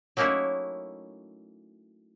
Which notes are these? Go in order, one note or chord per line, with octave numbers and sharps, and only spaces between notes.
F#3 A3 A#3 C#4 D#4 E4